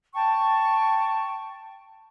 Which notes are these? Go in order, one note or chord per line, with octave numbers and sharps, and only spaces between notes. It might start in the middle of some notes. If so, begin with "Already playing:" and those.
G5 A5 C#6